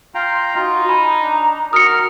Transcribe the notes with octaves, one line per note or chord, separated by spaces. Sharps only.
F4 F5 G5 A#5
D#4 F4 F#4
G#5 A#5 B5
D4
D#3 F#4 A#4 D#6 F6 C#7